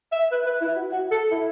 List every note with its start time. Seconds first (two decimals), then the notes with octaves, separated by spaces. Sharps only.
0.12 E5
0.32 B4
0.47 B4
0.61 E4
0.76 F#4
0.92 F#4
1.11 A4
1.31 E4